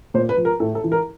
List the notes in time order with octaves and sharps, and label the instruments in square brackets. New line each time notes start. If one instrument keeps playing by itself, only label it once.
[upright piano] A#2 C5
B4
F3
A#4
A2 A4
A4
E3
A#4